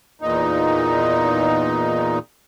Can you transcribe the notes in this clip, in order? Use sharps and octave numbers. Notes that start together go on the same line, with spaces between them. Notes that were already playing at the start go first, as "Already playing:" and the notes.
E2 A#2 D#4